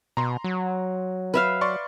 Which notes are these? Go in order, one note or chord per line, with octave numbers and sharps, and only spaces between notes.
B2 A#5 C6
F#3
B4 E5 F5
D5 C6 C#6